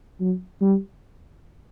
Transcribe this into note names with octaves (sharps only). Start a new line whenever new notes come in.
F#3
G3